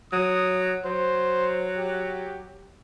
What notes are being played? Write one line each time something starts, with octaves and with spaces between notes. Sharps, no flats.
F#3 D#6
F#3 C5
G4